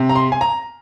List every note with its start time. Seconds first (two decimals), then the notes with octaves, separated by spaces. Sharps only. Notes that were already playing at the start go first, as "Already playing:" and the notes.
Already playing: C3
0.09 A#5
0.15 C6
0.32 G#5
0.41 A#5